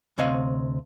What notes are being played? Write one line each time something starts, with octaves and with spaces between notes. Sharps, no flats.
D2 C3 C4 C#5 D#5 F5